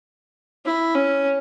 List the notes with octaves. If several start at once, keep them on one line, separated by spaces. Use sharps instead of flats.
E4
C#4